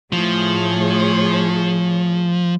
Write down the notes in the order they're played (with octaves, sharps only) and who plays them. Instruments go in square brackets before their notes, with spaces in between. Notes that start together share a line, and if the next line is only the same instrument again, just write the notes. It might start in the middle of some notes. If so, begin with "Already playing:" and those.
[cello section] A2 G#4 C#5 [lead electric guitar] F3